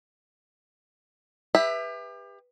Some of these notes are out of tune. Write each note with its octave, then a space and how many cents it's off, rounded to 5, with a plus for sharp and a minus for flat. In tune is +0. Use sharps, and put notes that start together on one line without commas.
G4 +35 B4 +0 E5 +0